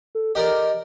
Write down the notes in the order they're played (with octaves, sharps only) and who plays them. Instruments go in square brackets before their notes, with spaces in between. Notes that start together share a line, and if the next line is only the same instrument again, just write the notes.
[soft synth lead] A4
[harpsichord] G4 A#4 D5 [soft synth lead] D#5